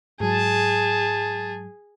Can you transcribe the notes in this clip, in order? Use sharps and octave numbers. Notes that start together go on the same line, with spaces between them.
G#2 F#3 G#4 A5